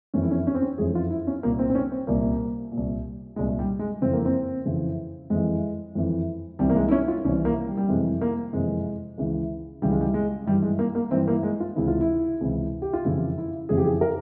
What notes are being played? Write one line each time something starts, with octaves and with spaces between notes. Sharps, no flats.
F2 E3 C#4
E4
C#4
C#4
C4
C#4
F2 E3 G#4
F4
E4
C#4
C2 A#2 A#3
C4
C4
C#4
C4
C2 A#2 A#3
A#2
C2
C2 A#2 G#3
G3
G#3
F2 C#3 E3 C4
A#3
C4
F2 C#3 E3
F2 E3 G#3
F2 E3
C2 C3 E3 G3
A#3
G#3
E4
C#4
F4
C2 C3 E3 C#4
A#3
G3
G3
F2 C3 E3 G#3
A#3
F2 C3 E3 G#3
C#2 C#3 E3
C#2 C#3 E3 G3
G#3
G3
G#3
G2 E3 G3
G#3
A#3
A#3
G2 E3 C4
A#3
G#3
F4
C#2 C3 E3 E4
F4
E4
C#2 C3 E3
G4
F4
F2 C#3 E3 E4
E4
F2 C#3 E3 G#4
G4
G#4
A#4